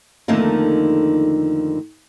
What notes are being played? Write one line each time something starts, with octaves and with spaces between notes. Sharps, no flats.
F2 D3 D#3 A3 A#3 D#4